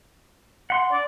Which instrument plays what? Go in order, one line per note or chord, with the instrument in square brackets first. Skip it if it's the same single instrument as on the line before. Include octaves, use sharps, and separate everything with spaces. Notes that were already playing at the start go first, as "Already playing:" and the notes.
[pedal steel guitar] F#5 C6
[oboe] D5